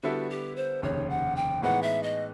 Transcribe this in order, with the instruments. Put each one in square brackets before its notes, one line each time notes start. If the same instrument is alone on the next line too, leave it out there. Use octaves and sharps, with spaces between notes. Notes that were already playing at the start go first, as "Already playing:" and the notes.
[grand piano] D3 G3 B3 E4 A4 [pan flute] F#4
[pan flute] G4
C5
[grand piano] F1 D#2 C#3 [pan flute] C#5
[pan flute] F#5
G5
[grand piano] A2 E3 G#3 B3 D#4 [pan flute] F#5
[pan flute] E5
D#5